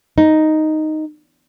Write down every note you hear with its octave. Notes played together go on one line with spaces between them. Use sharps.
D#4